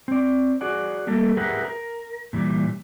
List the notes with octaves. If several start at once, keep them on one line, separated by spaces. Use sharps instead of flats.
C4 D5
F#4 G#4 D5 F#5
G3 A3 A#3 A4
G4 G#4 A#4 B4 E5 F#5
A#4
A#2 E3 G3